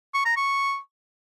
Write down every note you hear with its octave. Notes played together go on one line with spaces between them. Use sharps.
C#6
A#5
C#6